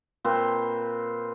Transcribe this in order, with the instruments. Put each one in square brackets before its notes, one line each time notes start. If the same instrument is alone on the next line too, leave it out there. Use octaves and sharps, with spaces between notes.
[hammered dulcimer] A#2 C4 B4 C5